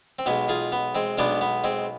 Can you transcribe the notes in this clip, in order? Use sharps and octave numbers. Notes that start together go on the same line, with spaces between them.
C4
B1 B2 G#3 B3
F4 G#4
B3
G#3 C4
B1 B2 G#3 B3 D4
B3
G#3 C4